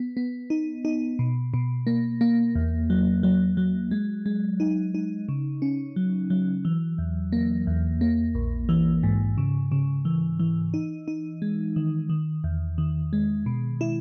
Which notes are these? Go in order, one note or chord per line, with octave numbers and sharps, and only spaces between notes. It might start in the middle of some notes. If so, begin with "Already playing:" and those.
Already playing: B3
B3
D#4
D#4
B2
B2
A#3
A#3
E2
F#3
F#3
F#3
G#3
G#3
D#4
D#4
C#3
C#4
F#3
F#3
E3
E2
A#3
E2
A#3
A#1
E3
G#2
C#3
C#3
E3
E3
D#4
D#4
G#3
D#3
D#3
E2
D#3
G#3
B2
E4